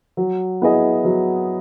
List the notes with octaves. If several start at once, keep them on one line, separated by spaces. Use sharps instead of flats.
F#3
B3 E4 G#4 D#5
F#3